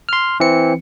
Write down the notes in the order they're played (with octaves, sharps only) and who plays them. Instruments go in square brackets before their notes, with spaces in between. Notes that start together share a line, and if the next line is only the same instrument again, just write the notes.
[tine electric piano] C6 F6
E3 C4 C#7